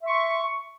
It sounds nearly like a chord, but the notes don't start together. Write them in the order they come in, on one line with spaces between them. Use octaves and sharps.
E5 C6 C#6